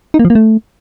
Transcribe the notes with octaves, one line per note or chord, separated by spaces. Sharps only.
D#4
A#3
F3
A#3
A3